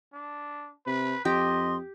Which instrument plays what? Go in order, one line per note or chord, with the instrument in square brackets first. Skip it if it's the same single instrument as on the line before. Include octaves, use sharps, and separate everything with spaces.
[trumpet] D4
[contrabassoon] C3 [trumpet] B4
[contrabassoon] F2 [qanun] G4 [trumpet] D#5 [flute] C6